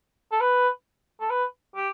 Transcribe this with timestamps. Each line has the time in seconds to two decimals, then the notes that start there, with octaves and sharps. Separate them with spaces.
0.32 A4
0.41 B4
1.20 A4
1.30 B4
1.75 G4